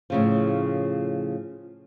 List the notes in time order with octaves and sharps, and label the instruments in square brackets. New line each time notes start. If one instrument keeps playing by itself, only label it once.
[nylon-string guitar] A2 C#3 F3